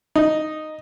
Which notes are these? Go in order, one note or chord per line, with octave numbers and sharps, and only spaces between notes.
D#4